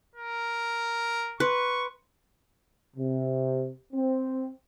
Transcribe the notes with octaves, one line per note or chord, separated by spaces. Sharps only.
A#4
B4 C6 C#6 F#6
C3
C4